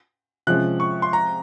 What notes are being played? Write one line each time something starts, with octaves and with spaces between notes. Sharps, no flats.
C3 F3 G#3 C#4 F#6
C#6
C6
A#5